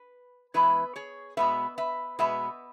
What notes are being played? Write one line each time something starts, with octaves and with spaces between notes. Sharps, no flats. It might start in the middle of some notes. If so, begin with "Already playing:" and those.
Already playing: B4
E3 G#3 B3 B4 E5
G#4 C#5
B2 G#3 B3 B4 E5
B4 E5
B2 G#3 B3 B4 E5